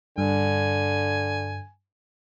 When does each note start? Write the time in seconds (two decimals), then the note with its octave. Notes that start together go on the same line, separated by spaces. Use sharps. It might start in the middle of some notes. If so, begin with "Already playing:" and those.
0.18 G2 D3 G#5